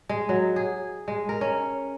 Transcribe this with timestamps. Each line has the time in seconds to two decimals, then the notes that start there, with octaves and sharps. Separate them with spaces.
0.09 G#3
0.29 F#3
0.56 G#4
1.08 G#3
1.29 A#4
1.41 C#4